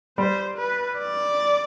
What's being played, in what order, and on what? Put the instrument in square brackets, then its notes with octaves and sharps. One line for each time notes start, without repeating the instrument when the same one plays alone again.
[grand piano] G3 [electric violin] C5
[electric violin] B4
D5